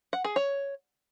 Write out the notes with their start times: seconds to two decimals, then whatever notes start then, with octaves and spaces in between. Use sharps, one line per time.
0.13 F#5
0.24 G#4
0.36 C#5